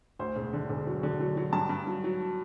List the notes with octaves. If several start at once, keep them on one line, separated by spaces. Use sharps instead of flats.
D2 C5
E1
D3
E1
F#3
D3
F#3
F#3
G2 A5
G2
F#3
F#3